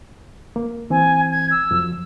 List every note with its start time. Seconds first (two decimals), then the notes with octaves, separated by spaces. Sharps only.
0.56 A#3
0.90 E3 C4 G#5
1.30 G#6
1.51 E6
1.71 F2 F3 F#3